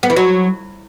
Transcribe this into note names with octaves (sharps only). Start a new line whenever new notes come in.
B3
E3
F#3